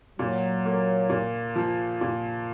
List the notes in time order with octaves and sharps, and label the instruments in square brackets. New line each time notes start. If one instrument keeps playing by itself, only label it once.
[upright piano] A#2 [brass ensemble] F#3
[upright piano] A#3
A#2
F3
A#2